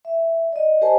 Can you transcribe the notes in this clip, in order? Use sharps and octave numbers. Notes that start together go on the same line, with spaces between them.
E5
D5 D#5
G4 A#4 C5 D#5 G#5 A5